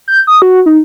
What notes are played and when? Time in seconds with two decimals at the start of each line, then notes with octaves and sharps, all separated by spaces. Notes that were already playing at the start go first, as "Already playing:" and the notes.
0.08 G6
0.27 D#6
0.42 F#4
0.66 D#4